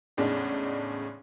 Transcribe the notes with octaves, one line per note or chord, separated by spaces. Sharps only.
E2 A2 C#3 G#3 D4 D#4